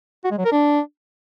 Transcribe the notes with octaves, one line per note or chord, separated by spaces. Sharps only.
F#4
G#3
F#3
A#4
D4